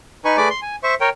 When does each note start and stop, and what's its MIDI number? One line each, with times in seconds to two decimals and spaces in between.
0.25 0.37 63
0.25 0.37 71
0.25 0.37 80
0.25 0.37 85
0.37 0.48 57
0.37 0.48 68
0.37 0.48 71
0.37 0.48 74
0.37 0.48 86
0.50 0.60 84
0.62 0.76 80
0.83 0.95 72
0.83 0.95 76
0.83 0.95 85
1.01 1.09 70
1.01 1.09 73
1.01 1.09 79